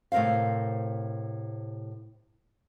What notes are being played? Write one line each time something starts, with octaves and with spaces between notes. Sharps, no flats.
A2 C3 A#4 C5 F5